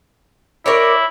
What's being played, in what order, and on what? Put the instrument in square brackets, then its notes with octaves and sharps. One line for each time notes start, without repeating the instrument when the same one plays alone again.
[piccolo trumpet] E4 [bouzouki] A#4 C#5 D5